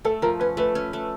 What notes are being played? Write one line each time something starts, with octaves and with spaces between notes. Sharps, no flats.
A3 A4
F3 A#4
C#4 B4
A3 B4
C#4
A3